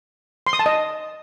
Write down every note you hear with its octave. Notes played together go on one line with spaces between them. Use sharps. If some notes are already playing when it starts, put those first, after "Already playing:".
C6
D#6
A5
D#5